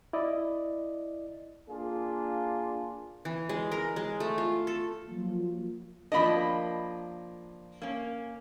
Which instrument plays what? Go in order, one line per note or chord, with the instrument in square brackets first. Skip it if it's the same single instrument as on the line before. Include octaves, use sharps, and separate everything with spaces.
[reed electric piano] E4 D5 D#5
[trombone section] A#3 D4 F4 G#4
[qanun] E3
G#3
A#4
G#3
A3
F4
A4
[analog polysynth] F3 F#3 A#3 F4
[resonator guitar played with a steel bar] F3 A#3 D4 [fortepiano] D#5 B5
[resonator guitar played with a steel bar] A#3 C#4